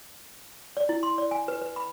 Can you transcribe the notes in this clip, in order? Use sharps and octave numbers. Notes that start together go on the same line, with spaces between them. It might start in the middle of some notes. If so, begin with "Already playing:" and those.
D5
E4
C6
D5
G#5
B4
B4
B5